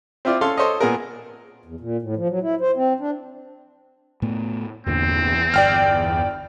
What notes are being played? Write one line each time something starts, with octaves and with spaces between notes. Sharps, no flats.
C4 E4 F4 D5
C#4 A4 F5 C6
A4 C5 C#5 D#5
A#2 B3 G#4 A#4
E2
A#2
A2
F3
F#3
E4
C5
C4
D4
A2 A3 B3
G1 E2 A#2 D3 C4
G1 D5 G5 F6